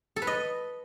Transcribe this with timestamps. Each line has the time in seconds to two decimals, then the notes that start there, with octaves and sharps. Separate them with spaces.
0.16 A4
0.22 B4
0.27 D#5